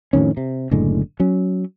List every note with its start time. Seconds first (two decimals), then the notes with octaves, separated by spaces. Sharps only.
0.13 F2 A2 D#3 C#4
0.37 C3
0.71 F#1 A2 D3 G#3
1.20 F#3 C#4